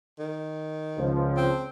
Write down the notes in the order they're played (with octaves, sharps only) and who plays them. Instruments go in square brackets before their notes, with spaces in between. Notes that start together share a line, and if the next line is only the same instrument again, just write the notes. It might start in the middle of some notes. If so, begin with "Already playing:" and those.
[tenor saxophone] D#3
[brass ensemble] C#2 F3
[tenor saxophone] C4